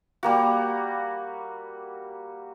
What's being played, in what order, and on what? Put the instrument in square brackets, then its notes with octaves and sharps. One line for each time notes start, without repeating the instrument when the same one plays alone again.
[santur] G3 A#3 F#4